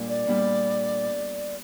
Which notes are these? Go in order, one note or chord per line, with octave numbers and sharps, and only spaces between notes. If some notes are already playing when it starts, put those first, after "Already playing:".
Already playing: A#2 G3 D4
D5
A#2 G3 B3 D4